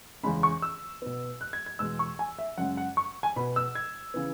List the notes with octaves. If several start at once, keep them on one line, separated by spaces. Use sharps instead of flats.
E2 C#3 G#3 C#4 B5
C#6
E6
B2 B3
F#6
G#6
G#6
E2 B2 G#3 E6
C#6
G#5
E5
F#2 C#3 G#3 C#4 F#5
F#5
C#6
G#5
B2 B3 B5
E6
G#6
C#3 E3 B3